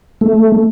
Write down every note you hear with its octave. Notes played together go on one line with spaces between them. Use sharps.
A3